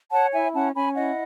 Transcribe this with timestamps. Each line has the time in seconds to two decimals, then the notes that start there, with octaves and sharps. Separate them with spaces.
0.11 C#5 F#5 A5
0.32 E4 E5 G#5
0.54 C#4 F#5 A5
0.74 C#4 G#5 B5
0.95 E4 D#5 F#5